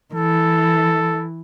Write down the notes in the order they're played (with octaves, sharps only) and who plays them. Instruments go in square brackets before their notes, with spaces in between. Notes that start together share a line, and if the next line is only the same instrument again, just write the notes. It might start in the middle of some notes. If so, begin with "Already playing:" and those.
[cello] E3 [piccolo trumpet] A4